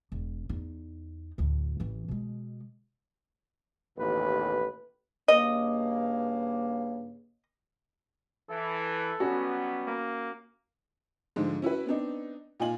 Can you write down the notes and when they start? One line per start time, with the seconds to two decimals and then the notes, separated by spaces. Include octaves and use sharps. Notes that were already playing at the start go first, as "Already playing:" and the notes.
0.12 E1
0.49 E2 D#4
1.38 D2 A2
1.80 A1 E3
2.08 B2 G#3
3.98 A1 D#2 B2 E3 B4
5.28 G2 C#3 A#3 D#5
8.49 E3 A4
9.20 F#3 G3 B3 C#4 F#4
9.87 A#3
11.36 G#2 D3 F3 G#3
11.62 C#4 E4 F#4 B4
11.86 B3 C4 D4 D#4
12.60 A#2 D#4 F4 G#5 F#7